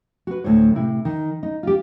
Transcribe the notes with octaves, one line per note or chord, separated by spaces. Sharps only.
F#4 B4
D2 A2 C5 C#5
A2 C3 E4
D#3
D#4
F4 G4